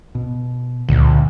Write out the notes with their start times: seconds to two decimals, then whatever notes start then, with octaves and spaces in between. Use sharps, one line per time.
0.15 B2
0.89 C#2 A#2 D3 G#3